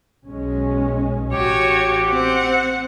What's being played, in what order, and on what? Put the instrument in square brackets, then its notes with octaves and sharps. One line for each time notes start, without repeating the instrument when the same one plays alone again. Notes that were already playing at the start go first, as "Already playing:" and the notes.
[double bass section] B1 G#3 C#4
[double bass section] A1 [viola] F#4 C#5 [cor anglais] G4
[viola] C4 F#5